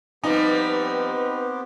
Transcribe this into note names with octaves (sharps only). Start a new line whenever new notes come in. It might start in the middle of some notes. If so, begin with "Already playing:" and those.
F3 G3 B3 C4 D#4 G4 B4